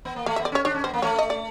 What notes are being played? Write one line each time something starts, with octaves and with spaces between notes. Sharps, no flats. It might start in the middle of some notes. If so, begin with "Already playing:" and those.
B3
A#3
A3 F5
E5
B3
D5
C#4 C#5
D4 C#5
C#4
B3 C5
A#3
A3 C#5
D#5
D5